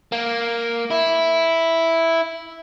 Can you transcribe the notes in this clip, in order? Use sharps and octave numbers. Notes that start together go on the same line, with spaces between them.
A#3
E4